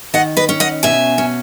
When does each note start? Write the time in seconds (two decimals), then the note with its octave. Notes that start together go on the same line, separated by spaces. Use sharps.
0.14 D#3 D#5 F#5
0.37 B4 D#5
0.49 C#4
0.60 D#5 F#5
0.83 B2 E5 G#5
1.18 C#4